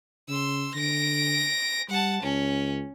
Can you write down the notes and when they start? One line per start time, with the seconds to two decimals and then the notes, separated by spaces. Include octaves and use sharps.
0.29 C#3 C6 E6
0.75 D3 A#6 D7
1.89 G3 F#5 A5
2.23 C#2 C#4